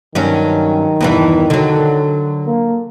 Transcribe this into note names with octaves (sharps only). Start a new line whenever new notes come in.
G2 D#3 F#3 C#4
E2 G2 E3
D3 F#3
A#3